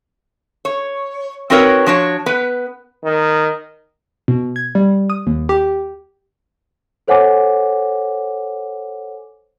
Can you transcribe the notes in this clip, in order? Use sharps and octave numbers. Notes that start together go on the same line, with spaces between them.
C#5
C4 D#4 F#4 A#4 B4 C#5
F3 D4 F#4 C#5
B3 B4
D#3
B2
G#6
G3
D#6
D#2
G4
A4 C5 C#5 F#5 G#5 D6